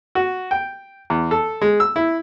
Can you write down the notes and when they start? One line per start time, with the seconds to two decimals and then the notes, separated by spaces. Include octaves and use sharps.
0.15 F#4
0.51 G5
1.10 E2
1.31 A4
1.61 G#3
1.80 E6
1.96 E4